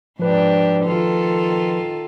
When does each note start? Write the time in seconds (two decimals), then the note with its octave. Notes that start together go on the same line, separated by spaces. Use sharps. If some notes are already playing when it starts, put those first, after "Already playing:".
0.19 G#2 F3 D4 G4 B4
0.85 D#3 F4 A4